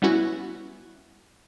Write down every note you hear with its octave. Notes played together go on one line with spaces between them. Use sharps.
G3 B3 C#4 E4 F#4